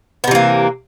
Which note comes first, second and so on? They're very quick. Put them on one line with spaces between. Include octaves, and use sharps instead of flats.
B3 C3 E3 A#3